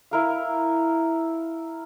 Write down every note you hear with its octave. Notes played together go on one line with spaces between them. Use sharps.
E4 A#4 F5